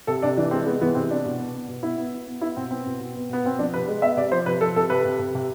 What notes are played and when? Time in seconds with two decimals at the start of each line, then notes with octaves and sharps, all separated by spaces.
0.07 C3 A4
0.22 C3 D4
0.37 E3 D4
0.51 G#3 C4
0.66 G#3 B3
0.81 E3 B3
0.95 C3 C4
1.10 B3 D4
1.25 B2
1.39 B3
1.54 B3
1.69 B2
1.83 B3 E4
1.98 B3
2.13 B3
2.27 B3
2.41 B3 E4
2.57 B2 C4
2.71 B3 C4
2.86 B2
3.00 B2
3.16 B3
3.29 B2 B3
3.44 B2 C4
3.59 F3 D4
3.74 C3 B4
3.88 G#3
4.02 B3 E5
4.17 C3 D5
4.32 F3 C5
4.46 C3 B4
4.61 F3 A4
4.76 C3 A4
4.90 C3 B4
5.05 C3
5.19 C3
5.35 C3